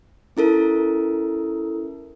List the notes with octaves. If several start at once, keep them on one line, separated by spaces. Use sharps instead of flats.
C#4 E4 A4 A#4